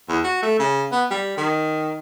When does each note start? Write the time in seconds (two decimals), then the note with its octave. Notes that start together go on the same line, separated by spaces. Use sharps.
0.09 E2
0.23 F#4
0.43 A3
0.59 C#3
0.92 B3
1.10 G3
1.37 D#3